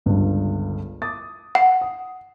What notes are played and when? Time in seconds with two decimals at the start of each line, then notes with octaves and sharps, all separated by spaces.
0.06 G1 C#2 G2
1.02 D6 D#6 A6
1.55 F#5
1.81 D#6